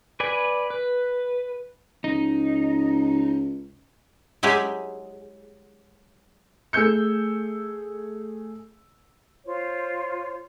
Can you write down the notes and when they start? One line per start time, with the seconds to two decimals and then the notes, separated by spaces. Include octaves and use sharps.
0.20 B4 D5 G#5
0.70 B4
2.04 C#2 D#4
4.43 F#3 G#3 E4 G4 G#4
6.73 A3 G#4 E6 G6 C#7
9.45 F4 C5 C#5